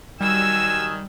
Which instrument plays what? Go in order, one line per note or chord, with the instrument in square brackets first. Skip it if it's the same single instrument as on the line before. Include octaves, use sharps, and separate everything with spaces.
[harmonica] D#3 F#3 G#5 [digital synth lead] G3 [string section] E6